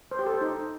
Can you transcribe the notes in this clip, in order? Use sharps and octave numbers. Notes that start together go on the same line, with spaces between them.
C5
G4
A4
C5
D#4